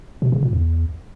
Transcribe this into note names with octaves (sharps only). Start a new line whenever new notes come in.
B2
C#3
A#2
E2